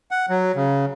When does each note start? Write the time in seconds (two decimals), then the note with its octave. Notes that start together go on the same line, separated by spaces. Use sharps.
0.11 F#5
0.29 F#3
0.55 C#3